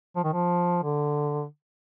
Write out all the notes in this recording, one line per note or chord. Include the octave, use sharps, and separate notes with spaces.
F3
D#3
F3
D3